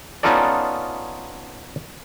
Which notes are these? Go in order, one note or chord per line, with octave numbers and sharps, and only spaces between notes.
B3 C#4 D#4 F4 A4 D5